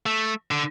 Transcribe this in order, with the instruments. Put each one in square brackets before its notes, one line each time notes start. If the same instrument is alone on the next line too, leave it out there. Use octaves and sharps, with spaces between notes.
[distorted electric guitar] A3
D3